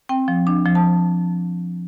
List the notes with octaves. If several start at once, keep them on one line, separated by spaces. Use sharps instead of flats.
C4 G5
F3
D4
F3
A5